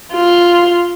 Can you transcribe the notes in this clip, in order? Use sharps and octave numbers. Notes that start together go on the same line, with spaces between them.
F4